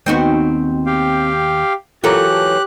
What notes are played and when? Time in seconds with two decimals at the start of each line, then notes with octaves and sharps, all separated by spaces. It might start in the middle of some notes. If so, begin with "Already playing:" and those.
0.06 D#2 B3 C4 D#4 F#4
0.86 G4 F5 G5
2.04 E3 F#3 F4 G4 A4 A#4 A#5 F#6